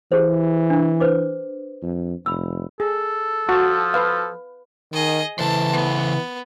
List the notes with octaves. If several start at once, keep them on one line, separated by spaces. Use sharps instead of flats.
E3 G4 G#4 C5
D4
B4 C5 D6
F2
F1 B5 E6
G#4 A4
F3 F#4 A5
B4 F5
D#3 G#4 D#5
C#3 E3 A4 C5 A5
B3